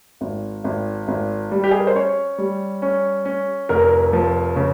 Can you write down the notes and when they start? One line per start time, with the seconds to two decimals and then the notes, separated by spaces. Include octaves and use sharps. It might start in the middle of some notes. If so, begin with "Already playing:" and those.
0.21 G#1
0.64 G#1
1.08 G#1
1.51 G3
1.64 G4
1.71 G#4
1.79 A#4
1.87 C5
1.95 C#4 C#5
2.38 G3
2.82 C#4
3.25 C#4
3.69 F1 A#4
4.13 F3
4.56 C#3